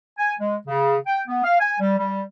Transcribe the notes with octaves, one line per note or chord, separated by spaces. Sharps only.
G#5
G#3
C#3
G5
B3
F5
G#5
G3
G3